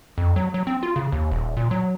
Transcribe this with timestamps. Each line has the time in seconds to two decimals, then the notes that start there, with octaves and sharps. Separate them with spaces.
0.18 F2
0.36 F#3
0.54 F#3
0.67 C4
0.83 F4
0.96 C#3
1.12 D#2
1.32 D#1
1.57 A#2
1.71 F#3